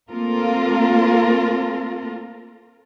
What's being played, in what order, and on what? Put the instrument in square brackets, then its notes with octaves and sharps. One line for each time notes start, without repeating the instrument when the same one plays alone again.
[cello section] A3 A#3 C4 F4 A4 A#4